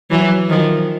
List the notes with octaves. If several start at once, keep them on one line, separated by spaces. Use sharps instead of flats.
E3 F#3
D#3 F3